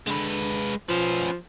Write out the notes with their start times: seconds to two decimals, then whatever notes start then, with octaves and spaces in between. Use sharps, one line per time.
0.07 D3 G#3 B4
0.89 F3 C#4 B4